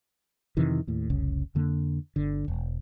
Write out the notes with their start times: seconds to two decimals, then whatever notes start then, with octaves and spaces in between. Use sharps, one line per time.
0.57 F2 C3 D#3 E3
0.87 D#2 A2
1.10 F1 C2 C#3
1.55 F2 D3 A#3
2.16 G1 D3
2.48 E1